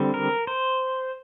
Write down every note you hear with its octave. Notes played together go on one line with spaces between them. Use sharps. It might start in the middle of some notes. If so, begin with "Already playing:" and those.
Already playing: D3 G3 C4
A#4
C5